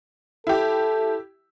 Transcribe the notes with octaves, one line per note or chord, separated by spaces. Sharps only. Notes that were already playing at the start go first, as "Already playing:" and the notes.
E4 G4 A4